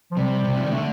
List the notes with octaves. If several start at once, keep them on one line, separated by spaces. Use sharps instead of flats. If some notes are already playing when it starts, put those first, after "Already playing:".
F3
C3 G3
C3
F3
D#3 G3
D3 A3